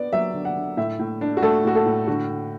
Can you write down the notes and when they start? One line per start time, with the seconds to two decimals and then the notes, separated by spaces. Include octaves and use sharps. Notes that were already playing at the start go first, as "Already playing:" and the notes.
Already playing: B3 D5
0.13 F#3 E5
0.34 D3
0.45 F#5
0.56 D3
0.77 A2 E5
0.99 A2
1.21 D4
1.37 F#4
1.42 A3 A4
1.65 A2 F#4
1.75 A4
1.86 A2
2.08 D3 F#4
2.29 D3